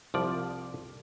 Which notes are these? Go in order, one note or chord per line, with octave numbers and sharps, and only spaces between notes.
C2 F3 D5